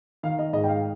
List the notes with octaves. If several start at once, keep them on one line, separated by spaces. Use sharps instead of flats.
D#3 F5
D#5
G#2 D#5
G5
F5